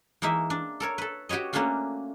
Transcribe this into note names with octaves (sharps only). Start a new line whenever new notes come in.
E3 G#3 A#3 D#4 E5
D4
A4 A#4 C#5
A4 B4
F#4 G4 B4 C#5 D#5
A3 A#3 C#4 D4 F4 F#4